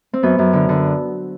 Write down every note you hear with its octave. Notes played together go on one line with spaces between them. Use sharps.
C4
F#2 B3
F#2
D3
D3